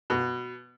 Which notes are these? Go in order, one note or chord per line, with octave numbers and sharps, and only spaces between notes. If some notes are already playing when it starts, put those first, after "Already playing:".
B2